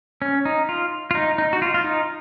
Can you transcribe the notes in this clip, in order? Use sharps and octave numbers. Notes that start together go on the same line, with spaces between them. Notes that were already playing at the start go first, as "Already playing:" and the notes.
C#4
D#4
F4
F4
D#4
D#4
F#4
F4
F4
D#4